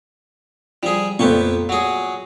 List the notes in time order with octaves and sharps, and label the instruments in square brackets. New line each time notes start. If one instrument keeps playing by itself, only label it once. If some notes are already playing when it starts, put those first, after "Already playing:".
[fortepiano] F3 [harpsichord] G3 G#4
[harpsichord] F2 G4 C#6 [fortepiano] A#2 A3 B3
[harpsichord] F#3 G#4